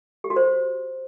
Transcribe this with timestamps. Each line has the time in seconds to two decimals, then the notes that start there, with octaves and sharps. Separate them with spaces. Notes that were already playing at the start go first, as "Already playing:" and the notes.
0.24 G4
0.30 F#4
0.36 C5